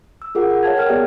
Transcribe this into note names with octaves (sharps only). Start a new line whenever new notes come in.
E6
F4 G#4 A#4 F#5
F#5
C#5 F5 A5 G#6
A#4 G5 F6
B3 G4 G#4 D5 E5